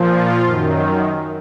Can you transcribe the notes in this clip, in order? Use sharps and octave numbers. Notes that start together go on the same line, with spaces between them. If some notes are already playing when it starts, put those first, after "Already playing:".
Already playing: A#2 F3
F4
F#2 D#3